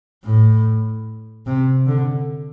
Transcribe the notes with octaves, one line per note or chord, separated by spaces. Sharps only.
A2
C3
D3